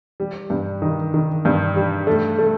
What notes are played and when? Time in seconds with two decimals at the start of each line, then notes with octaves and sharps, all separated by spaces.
0.20 G3
0.50 G2
0.82 D#3
1.14 D#3
1.45 G2
1.76 G3
2.07 A3
2.39 A3